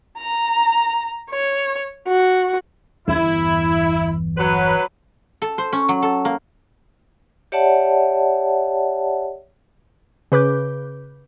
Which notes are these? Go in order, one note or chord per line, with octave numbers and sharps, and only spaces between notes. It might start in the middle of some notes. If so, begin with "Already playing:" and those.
A#5
C#5
F#4
G1 E2 E4
F#3 B4
A4
C5
C#4
F#3
A4
A#3
G4 C#5 D5 E5 F#5 A5
C#3 B4 D6 G6